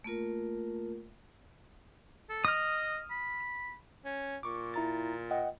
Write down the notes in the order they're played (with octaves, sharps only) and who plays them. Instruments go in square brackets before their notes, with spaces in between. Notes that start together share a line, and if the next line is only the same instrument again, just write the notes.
[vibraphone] A3 A#3 F4 A#4
[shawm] A4
[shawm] D#5 [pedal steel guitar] D#6 F6
[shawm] B5
[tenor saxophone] C#4
[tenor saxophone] A#2 [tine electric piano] C#6 D6
[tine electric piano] E4 A#5 A6
D#5 F#5 G5